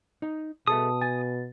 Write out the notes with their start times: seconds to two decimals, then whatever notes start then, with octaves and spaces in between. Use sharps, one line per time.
0.22 D#4
0.67 B2 G#4 A4 E5 A5 D#6
1.01 G#5 A6